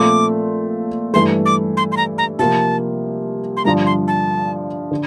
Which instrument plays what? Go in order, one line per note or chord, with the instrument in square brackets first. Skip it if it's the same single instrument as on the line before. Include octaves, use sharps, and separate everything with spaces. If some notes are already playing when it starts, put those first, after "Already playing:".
Already playing: [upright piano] A#2 F3 A3 C4 F4 [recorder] D6
[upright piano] G2 E3 A3 [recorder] C6
[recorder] D6
C6
C6
A#5
A#5
[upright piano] C3 F3 A#3 [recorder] A5
[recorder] C6
[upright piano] G2 D3 F3 [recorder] A#5
[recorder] C6
A5
[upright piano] D3